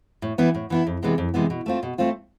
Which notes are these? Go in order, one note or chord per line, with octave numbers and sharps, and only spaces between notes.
A2
E3 B3 E4
A2
E3 B3 E4
F2
C3 E3 G#3 B3
F2
C3 E3 G#3 B3
B2
A3 C4 F4
B2
A3 C4 F4